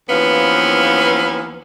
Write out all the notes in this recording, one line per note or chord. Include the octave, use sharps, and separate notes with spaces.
D#2 E3 F3 B3 C#4 F5